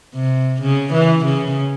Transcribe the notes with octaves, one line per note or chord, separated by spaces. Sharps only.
C3
C#3
E3
C#3